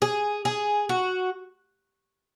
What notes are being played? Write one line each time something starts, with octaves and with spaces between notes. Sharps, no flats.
G#4
G#4
F#4